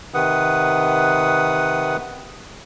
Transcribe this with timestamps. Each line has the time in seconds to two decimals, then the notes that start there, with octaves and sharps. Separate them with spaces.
0.14 C3 D#3 B4 F#5 D#6